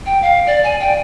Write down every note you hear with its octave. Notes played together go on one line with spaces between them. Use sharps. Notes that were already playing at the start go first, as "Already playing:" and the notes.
G5
F5
D5
G#5
G5